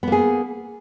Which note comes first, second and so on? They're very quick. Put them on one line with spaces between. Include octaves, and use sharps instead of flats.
B3 A#3 G#4